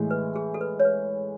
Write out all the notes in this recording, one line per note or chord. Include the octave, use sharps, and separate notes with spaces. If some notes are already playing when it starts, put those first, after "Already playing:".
Already playing: A2 E3 G#3
B4
G#4
A4
B4
C#5
B4